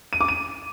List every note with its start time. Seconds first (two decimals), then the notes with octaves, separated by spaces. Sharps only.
0.13 D#7
0.21 D6
0.28 D#7